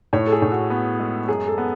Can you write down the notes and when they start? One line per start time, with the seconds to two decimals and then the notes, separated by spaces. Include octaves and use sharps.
0.13 A2 C#5
0.27 A4
0.32 G#4
0.42 A2
0.52 F#4
0.70 B3
1.00 G#3
1.28 F#2 G#4
1.48 A4
1.58 B3